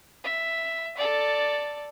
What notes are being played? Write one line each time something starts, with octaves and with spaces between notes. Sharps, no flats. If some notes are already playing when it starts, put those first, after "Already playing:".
E5
A4 D5